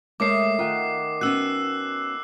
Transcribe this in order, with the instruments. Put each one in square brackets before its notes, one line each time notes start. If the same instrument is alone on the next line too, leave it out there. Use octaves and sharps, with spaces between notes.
[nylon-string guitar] G#3 A#4 C#5 [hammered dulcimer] A3 A4 D#5 [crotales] D6 C7
[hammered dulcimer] D#3 F#5 G#5 [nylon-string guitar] F4
[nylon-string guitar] B3 C#4 F#4 [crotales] E6 F#6